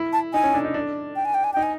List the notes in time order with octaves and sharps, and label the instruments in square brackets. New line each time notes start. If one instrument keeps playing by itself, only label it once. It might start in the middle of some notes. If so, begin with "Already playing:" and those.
Already playing: [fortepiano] E4
[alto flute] A5
[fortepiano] D#4 [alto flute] G#5
[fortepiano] C#4
D4
D#4
D4
[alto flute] G5
G#5
G5
G#5
[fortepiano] D#4 [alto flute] G5
[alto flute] G#5